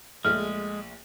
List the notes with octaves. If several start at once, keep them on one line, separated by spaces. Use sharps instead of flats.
A#1 G#3 A3 F6